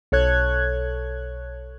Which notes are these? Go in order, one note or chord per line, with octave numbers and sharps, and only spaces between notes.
B1 A4 C#5 F#6 G#6